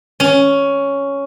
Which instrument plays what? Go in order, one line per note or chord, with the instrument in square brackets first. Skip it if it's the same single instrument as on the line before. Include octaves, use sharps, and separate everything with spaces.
[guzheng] C#4